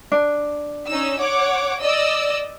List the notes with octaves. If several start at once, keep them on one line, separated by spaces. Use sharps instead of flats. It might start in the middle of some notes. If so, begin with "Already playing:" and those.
D4
C#4 D#4 E6
C#5 F#5 D6
D5 D#5 E6